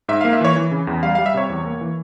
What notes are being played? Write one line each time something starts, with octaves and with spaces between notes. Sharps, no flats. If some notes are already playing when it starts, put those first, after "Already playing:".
G#2 E5
A#3 F5
E5
E3 C#5
E3
C#3
E2
G3 F5
G3 F5
E5
C3 C#5
E2
A#3
E3